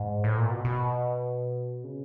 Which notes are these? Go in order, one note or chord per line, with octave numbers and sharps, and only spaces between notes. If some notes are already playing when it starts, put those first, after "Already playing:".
Already playing: G#2
A2
A#2
B2
B2
C#3